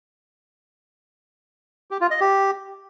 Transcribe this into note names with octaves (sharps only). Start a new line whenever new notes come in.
G4
F4
D#5
G4